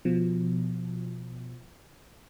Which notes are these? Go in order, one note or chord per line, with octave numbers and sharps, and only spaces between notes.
B2 F3